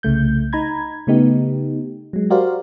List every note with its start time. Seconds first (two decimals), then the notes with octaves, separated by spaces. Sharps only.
0.03 C2 C#3 A3 G6
0.53 D#4 A#5 B5 G#6
1.07 C#3 A3 B3 D#4 G4
2.13 F#3 G#3
2.30 F#4 G4 A#4 C5 D5 F5